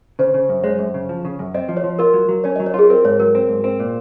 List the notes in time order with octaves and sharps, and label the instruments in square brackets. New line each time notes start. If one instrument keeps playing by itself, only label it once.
[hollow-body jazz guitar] C#3 [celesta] C5
[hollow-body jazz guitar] C#3
F#2
[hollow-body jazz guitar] G#3 [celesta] C#5
[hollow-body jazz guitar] F#2
C#3
F3
C#3
F#2
[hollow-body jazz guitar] C4 [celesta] D#5
[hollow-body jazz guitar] F3
[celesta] C#5
[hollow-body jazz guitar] F3
[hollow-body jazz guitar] F4 [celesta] A#4
[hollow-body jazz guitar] F#3
F#3
[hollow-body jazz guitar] C#4 [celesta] C#5
[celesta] D#5
[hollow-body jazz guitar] F#3
[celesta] C#5
[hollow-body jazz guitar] F4 [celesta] G#4
[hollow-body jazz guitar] C4 [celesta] A#4
[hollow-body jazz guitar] G#2 [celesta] C#5
[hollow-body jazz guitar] F#3 [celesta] A#4
[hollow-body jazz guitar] C4
G#2
C4
A#2